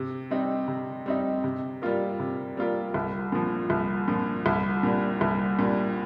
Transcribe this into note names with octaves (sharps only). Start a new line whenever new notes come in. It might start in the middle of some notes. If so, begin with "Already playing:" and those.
Already playing: C3
G3 C4 D#4
C3
G3 C4 D#4
C3
G3 A#3 F4 A#4
C3
G3 A#3 F4 A#4
C2
A#2 F3
C2
A#2 F3
C2
A#2 G3
C2
A#2 G3